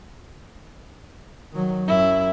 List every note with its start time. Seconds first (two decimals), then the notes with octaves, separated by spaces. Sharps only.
1.52 D#3 F#3
1.87 F#2 E4